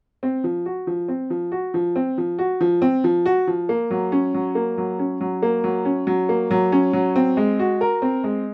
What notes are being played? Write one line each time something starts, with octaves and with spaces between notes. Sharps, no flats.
C4
F3
F#4
F3
C4
F3
F#4
F3
C4
F3
F#4
F3
C4
F3
F#4
F3
A#3
F#3
C#4
F#3
A#3
F#3
C#4
F#3
A#3
F#3
C#4
F#3
A#3
F#3
C#4
F#3
C4
G#3
F#4
A#4
C4
G#3